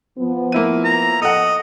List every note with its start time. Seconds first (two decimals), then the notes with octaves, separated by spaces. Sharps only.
0.19 F3 B3
0.52 A#3 E4 D#7
0.85 A#5
1.22 A4 D#5 F#5